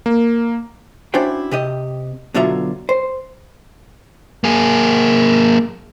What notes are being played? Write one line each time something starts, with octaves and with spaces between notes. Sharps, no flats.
A#3
C#4 D4 E4 F#4 C5 G5
C3 G4 D#5
B2 D3 F#3 F4 E5 A#5
C5
A#3 G#4